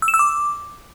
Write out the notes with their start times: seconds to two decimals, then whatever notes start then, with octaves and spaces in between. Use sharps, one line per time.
0.02 E6
0.08 E7
0.14 E6
0.19 D6